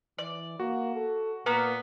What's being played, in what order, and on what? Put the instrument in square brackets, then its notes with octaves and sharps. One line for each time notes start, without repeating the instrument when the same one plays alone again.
[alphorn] E3 [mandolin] D5
[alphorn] A#3 [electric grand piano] F#4
[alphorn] A4
[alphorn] A#2 [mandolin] A#3 [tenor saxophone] B3